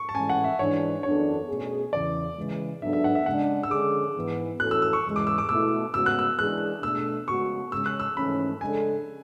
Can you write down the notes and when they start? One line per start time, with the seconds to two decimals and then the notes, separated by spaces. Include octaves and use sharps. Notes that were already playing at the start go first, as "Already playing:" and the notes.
Already playing: C#6
0.09 A5
0.14 A2 E3 G#3 C#4 G#5
0.29 F#5
0.44 E5
0.59 G#2 E3 G#3 D4 C#5
1.03 F#2 E3 B3 D4 A4 C#5
1.48 B2 A3 C#4 G#4
1.93 E2 C#3 E3 D5
2.37 C#3 E3 G#3
2.81 G#2 F#3 B3 D4 A4 E5
2.93 E5
3.04 F#5
3.15 E5
3.26 C#3 G#3 D4 F#5
3.63 E6
3.71 D3 G#3 C#4 G#4 D6
4.16 G#2 E3 B3
4.60 E3 A3 C#4 F#4 A4 F#6
4.71 E6
4.82 E6
4.93 C#6
5.05 E2 C#3 E3 G#3
5.16 D6
5.27 E6
5.38 D6
5.49 B2 A3 E4 E6
5.94 C#3 G#3 B3 F#4 E6
6.06 F#6
6.19 E6
6.38 E3 G#3 D4 G#4 F#6
6.82 B2 A3 D4 E6
7.27 C#3 G#3 B3 F#4 C#6
7.72 C#3 G#3 C#4 E6
7.86 F#6
8.00 E6
8.16 G#2 E3 A3 C#4 B5
8.61 C#3 G#3 D4 A4 G#5